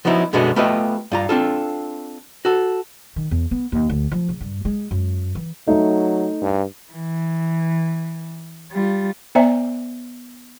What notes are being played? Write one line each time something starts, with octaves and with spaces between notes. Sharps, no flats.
F3 F#3 B3 D#4 E4
F#2 B2 D3 G#3 B3 F#4
A3 B3 F4 G4 B4 D#5
G2 F4 A#5
C4 D4 F4 A4
F#4 A4
D#3
E2
B3
D#2
D2
F3
C#3
G2
G#3
F#2
E3
F#3 A3 D#4
G2
E3
G3 F4
B3 C5 D5 E5 G#5 A#5